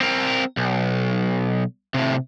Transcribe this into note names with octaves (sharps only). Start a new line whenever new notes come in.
C4 A#4
B1
A2 C3